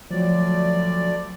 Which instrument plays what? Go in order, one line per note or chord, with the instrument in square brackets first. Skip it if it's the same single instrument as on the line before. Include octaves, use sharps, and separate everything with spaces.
[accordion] D2 D5 [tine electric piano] F3 F#3